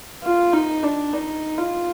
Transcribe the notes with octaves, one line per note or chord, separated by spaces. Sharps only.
F4
D#4
D4
D#4
F4